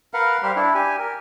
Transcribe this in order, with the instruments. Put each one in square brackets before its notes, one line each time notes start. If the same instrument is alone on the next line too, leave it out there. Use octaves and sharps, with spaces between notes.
[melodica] A#4 B4 F5 F#5
G3 G4 C5 F5
D4 E4
G4 G#5
A#4